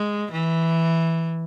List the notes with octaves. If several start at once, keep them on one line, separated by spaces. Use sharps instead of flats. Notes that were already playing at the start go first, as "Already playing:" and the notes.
Already playing: G#3
E3